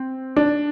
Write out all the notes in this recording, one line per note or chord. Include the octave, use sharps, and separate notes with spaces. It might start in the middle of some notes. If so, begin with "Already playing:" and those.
Already playing: C4
D4